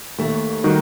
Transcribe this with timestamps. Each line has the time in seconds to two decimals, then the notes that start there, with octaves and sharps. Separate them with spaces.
0.18 D#2 A3
0.64 D#3 G3 D#4 F#4